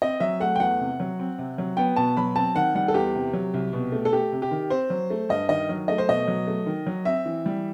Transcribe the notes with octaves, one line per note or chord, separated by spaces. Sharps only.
C4 D#5
F#3 E5
A3 F#5
G5
E2 F#5
C3
F#3
C4
C3
F#3
B3 G5
B2 A5
F#3 B5
C4 A5
D#3 F#5
G3 F#5
A4
E2 G4
C3
F#3
C2
B2
A3
A4
A3 G4
C3
G4
D#3
C4 C5
F#3
A3
G2 D#5
D#3 D#5
F#3
A3 D#5
C5
B2 D#5
F#3
A3
D#3
F#3
C4 E5
E3
G3